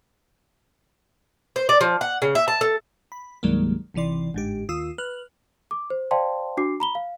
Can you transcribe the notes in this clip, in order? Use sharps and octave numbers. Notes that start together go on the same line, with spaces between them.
C5
D5
F3
F#5
C#3
E5
A5
A4
B5
C2 G2 D#3 F#3 G#3 A#3
G#1 C3 E3 D5 C6
G1 G#2 G4
D#2 F4 D#6 E6
B4 F6 F#6
D6
C5
C5 D5 F5 G5 A5 C6
D4 F#4 D6 C7
A#5 B5 G7
F5